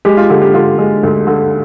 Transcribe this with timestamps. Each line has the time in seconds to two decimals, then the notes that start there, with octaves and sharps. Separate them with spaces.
0.05 G#3 G4
0.17 F4
0.30 D3 G4
0.42 G4
0.54 D3 F4
0.78 G#3
1.03 D2
1.27 D3